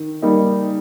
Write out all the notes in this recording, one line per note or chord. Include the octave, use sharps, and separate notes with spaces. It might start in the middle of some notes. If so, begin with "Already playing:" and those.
Already playing: D#3
G3 A#3 D#4